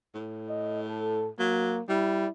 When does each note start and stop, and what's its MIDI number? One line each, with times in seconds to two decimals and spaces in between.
0.15 1.30 45
0.49 0.80 75
0.87 1.30 69
1.39 1.80 54
1.39 1.83 58
1.89 2.27 55
1.89 2.30 64